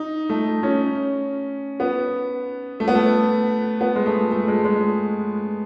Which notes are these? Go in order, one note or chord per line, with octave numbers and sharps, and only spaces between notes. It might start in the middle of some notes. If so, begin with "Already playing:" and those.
Already playing: D#4
A3
C#4
B3
A3
B3
A3
B3
G#3
A3
A3
G#3
G#3